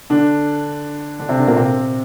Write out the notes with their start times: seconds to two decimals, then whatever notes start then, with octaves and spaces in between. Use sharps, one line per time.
0.10 D3 D4
1.19 D3 D4
1.29 C3 C4
1.38 D3 D4
1.47 A#2 A#3
1.56 C3 C4